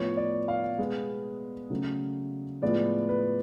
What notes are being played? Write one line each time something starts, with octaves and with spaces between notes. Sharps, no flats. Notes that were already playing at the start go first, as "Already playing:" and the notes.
Already playing: A2 F3 B3 C#5
D5
F5
B2 G#3 B3
C#3 F#3 A3
A2 F3 G#3 B3 D5
B4